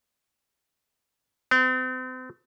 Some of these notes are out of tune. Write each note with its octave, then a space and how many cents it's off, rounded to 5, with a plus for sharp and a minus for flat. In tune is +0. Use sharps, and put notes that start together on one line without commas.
C4 -40